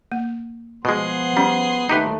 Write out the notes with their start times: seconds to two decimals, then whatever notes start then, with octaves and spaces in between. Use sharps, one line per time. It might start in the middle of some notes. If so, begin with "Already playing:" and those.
0.12 A#3
0.85 B2 F3 G#3 B3 G#4 F#5 C6
1.37 G3 C#4
1.89 D#2 A3 D#4 G4 B4